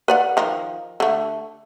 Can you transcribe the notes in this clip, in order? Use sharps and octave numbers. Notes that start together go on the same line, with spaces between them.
B4 D5 F#5
D#3 F3
D3 A3